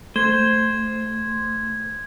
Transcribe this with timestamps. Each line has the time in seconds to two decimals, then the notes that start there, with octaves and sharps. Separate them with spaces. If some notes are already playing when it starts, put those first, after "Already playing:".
0.16 A3 C5 G#6